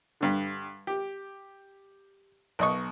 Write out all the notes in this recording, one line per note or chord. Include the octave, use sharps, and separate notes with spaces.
G2 D3
G4
B1 D#5 C#6